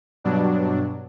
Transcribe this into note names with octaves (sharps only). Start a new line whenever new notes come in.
G2 B2 F#3 D4